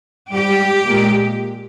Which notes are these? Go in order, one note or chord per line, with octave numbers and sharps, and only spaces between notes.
G#2 G3 G4
A#2 G#3